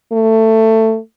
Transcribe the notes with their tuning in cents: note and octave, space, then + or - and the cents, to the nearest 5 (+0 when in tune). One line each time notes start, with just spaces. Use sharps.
A3 +15